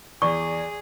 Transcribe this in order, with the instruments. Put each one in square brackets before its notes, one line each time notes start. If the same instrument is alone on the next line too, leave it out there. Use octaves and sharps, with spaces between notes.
[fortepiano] E2 [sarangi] G#4 [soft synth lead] D5 [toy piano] C#6